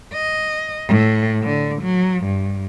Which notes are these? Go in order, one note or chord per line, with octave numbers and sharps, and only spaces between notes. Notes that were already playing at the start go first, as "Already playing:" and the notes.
D#5
A2
D3
F#3
G2